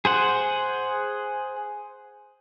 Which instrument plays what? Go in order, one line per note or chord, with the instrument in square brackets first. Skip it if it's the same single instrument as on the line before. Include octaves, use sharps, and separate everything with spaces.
[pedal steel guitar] G#4 C5 F#5